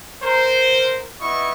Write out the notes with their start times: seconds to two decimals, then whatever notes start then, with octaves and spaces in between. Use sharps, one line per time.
0.22 A#4 C5
1.20 B3 E4 D#5 C#6